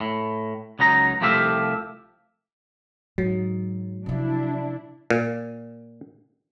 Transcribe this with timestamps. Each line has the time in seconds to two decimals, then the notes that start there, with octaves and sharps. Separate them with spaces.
0.01 A2
0.79 C#2 F#3 D#4 A#5
1.21 C2 F3 A3 G4 E5 F5
3.18 G#2 F#3
4.06 C3 F3 D4 E4
5.10 A#2